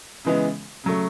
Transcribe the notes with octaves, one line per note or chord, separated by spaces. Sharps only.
C#3 E3 G#3 B3
C#3 F#3 A3